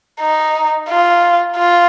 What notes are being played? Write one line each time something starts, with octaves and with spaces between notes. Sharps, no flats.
D#4
F4
F4